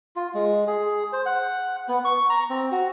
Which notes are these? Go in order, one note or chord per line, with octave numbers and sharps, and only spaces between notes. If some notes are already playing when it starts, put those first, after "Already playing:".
F4
G#3
G#4
C5
F#5
B3
C#6
A#5
C4
F#4